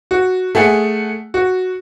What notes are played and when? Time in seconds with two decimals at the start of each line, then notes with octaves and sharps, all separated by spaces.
0.11 F#4
0.55 A3 G#4 F#5
1.34 F#4